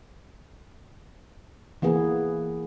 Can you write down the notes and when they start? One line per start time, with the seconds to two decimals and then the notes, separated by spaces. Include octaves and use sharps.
1.82 E3 A#3 B3 G#4